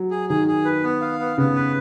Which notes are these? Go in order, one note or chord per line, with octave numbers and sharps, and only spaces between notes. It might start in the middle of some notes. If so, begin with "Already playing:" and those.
Already playing: F#3
G#4
D#3 G#4
G#4
B4
B3
F5
B3
C#3 B3
B4